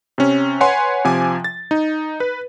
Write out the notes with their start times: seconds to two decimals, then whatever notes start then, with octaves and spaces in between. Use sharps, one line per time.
0.18 C3 C#4
0.61 B4 C#5 F#5 G#5 C6
1.05 C3 F3 G#5 D6
1.44 A6
1.71 D#4
2.20 B4